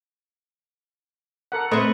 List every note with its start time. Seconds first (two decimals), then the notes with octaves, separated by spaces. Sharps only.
1.52 A4 A#4 F#5
1.71 A3 C4 B4 D#5 C#6